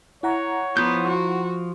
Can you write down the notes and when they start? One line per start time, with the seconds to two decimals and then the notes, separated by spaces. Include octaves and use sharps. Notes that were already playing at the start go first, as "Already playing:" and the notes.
0.23 E4 C#5 F#5 A#5
0.77 F3 B3 F4 G6
1.08 F#4